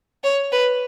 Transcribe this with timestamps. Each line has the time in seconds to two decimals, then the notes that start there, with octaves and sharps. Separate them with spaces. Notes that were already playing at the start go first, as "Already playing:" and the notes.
0.24 C#5
0.52 B4